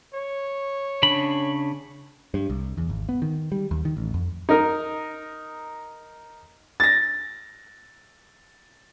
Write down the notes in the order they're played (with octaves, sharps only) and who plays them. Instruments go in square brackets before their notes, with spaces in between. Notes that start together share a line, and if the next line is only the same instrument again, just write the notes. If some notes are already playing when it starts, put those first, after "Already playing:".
[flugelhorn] C#5
[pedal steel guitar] C#3 D4 B5
[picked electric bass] G2
C2
E2
G#1
B3
D#3
G3
D#2
D#3
A1
F2
[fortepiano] D#4 A#4 D#6
[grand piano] A6 A#6